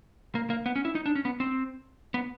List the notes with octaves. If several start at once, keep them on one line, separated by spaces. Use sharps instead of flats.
A#3
A#3
B3
C#4
E4
D#4
D4
C#4
B3
C4
B3